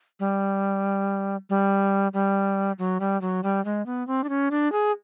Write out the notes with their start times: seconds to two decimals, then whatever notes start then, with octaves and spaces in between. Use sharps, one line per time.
0.20 G3
1.50 G3
2.14 G3
2.79 F#3
3.00 G3
3.21 F#3
3.43 G3
3.65 G#3
3.86 B3
4.07 C4
4.24 D4
4.29 C#4
4.51 D4
4.72 G#4